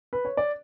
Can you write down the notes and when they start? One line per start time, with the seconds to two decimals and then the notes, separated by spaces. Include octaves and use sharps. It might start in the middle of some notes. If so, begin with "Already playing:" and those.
0.13 B4
0.25 C#5
0.37 D5